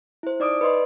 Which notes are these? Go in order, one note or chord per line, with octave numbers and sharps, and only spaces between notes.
E4 C5
D#4 D5 D6 D#6 D7
B4 D5 D#5 C6